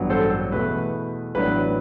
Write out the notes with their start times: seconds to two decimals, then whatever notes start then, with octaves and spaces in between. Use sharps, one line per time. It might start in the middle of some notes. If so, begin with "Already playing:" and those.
Already playing: A1 G2 F#3 B3 D4
0.10 A4 C5
0.52 E2 B2 A3 B4
1.35 A1 A2 F#3 B3 D4 B4